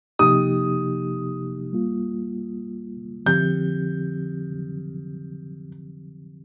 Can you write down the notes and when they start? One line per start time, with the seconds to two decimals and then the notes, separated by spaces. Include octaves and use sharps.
0.19 C3 F3 A#3 D#4 G4 D#6
1.73 G3 A#3 F4
3.26 D3 F3 C4 G4 G6